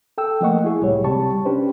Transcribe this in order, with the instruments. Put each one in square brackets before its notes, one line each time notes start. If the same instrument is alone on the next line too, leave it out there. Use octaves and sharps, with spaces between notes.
[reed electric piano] A4 G5 E6
F3 A3 A#3 D#5 F#5 C#6
E4 G#4
C2 A2 G3 C#5
C3 G3 C4 A5 C#6
C#4 D4 G4 B4 C5